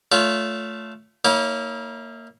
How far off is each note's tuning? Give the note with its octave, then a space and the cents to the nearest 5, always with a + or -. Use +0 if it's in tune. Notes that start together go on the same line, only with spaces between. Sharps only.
A3 +0 F4 -5 C#5 +35
A#3 -20 E4 -45 C#5 +10